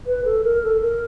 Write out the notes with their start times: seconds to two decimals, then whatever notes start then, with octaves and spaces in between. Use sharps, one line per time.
0.07 B4
0.25 A4
0.44 A#4
0.63 A4
0.81 A#4